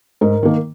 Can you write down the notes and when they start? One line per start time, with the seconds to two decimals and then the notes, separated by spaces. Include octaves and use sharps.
0.21 G#2 A#4
0.43 D#3 A#3